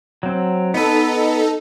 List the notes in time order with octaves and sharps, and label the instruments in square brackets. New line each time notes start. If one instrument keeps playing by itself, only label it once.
[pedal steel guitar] F#3 C4
[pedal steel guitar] B3 B4 [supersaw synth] D#4 A4